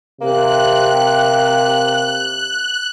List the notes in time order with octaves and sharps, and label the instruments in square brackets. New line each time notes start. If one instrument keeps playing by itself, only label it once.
[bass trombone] C3 [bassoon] A#3 [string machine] F#6